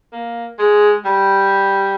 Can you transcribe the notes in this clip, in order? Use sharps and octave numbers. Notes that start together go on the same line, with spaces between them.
A#3
G#3
G3